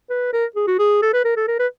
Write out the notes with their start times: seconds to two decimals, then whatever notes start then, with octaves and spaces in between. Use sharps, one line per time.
0.10 B4
0.33 A#4
0.56 G#4
0.67 F#4
0.79 G#4
1.02 A4
1.13 B4
1.25 A#4
1.36 A4
1.48 A#4
1.59 B4